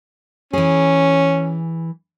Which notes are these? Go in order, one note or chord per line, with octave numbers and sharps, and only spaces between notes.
E3 C#4 G#4